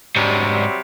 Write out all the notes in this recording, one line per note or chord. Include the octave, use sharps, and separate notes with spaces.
G#2 C3 F#3 G3 D4